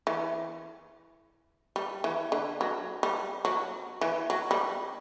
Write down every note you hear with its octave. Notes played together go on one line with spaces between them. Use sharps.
E3
G3
E3
D3
F#3
G3
F#3
E3
F#3
G3